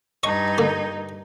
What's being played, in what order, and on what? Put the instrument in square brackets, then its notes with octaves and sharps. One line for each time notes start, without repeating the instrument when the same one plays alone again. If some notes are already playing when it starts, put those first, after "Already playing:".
[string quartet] G2 D#4 [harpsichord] D#5 C#6
[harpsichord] D3 A#3